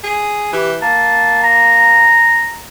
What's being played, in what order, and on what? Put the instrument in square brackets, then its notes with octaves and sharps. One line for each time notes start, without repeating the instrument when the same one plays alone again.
[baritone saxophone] G#4
[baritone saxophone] E3 [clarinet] G4
[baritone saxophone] A#3 [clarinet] A5
[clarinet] A#5